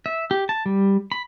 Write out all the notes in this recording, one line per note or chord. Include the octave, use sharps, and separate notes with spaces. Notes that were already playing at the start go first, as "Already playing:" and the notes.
E5
G4
A5
G3
B5